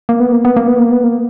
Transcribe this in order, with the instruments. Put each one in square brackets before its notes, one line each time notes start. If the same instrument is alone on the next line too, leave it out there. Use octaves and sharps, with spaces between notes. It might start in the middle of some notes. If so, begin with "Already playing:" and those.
[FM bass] A#3
B3
A#3
B3
A#3
B3
A#3
B3
A#3